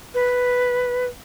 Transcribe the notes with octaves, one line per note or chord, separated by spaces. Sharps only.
B4